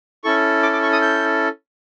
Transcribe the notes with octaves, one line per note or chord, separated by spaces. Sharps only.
C#4 E4 A4 C#6
D6
D6
C#6
D#6
G6